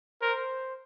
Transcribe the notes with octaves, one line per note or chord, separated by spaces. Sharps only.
A#4 C5